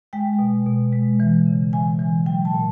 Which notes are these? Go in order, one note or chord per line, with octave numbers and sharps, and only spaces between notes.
G#3 G5
B2
B2
G#3
E3
C#3
E3 G#5
E3
F#3 G5
A5
A#2